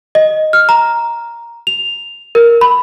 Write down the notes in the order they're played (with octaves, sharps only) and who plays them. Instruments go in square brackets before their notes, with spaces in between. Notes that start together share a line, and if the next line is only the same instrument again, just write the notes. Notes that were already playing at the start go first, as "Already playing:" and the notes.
[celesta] D#5
F6
A#5
F7
A#4
B5